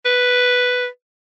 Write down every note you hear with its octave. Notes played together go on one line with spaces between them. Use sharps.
B4